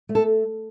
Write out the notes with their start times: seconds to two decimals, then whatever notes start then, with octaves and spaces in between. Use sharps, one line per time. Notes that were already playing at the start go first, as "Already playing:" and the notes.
0.09 A3
0.15 A4